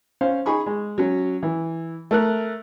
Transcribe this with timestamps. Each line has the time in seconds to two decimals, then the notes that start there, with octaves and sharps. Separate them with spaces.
0.21 C#4 C5 F5
0.46 D#4 G#4 B5 C#6
0.66 G#3
0.98 F#3 C#4
1.43 E3
2.11 A3 A#4 F#6